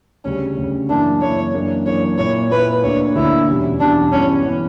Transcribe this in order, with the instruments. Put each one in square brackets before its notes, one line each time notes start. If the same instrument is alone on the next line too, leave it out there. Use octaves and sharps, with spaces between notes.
[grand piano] D2 C#3 G3 [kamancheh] C#4
[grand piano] D2 C#3 G3
[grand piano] F#2 E3 A#3 E4 [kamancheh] D4
[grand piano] F#2 E3 A#3 E4 [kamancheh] C#5
[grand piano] F#2 E3 A#3 D4
[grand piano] F#2 E3 A#3 D4 [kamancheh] C#5
[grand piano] A#2 A#3 E4 [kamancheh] C#5
[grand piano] A#2 A#3 E4 [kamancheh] B4
[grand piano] D2 D3 A#3 D4 [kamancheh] C#5
[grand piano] D2 D3 A#3 D4 [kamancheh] E4
[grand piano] E2 B2 G3 C#4
[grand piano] E2 B2 G3 C#4 [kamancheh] D4
[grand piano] G2 E3 B3 [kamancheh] C#4
[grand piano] E3 B3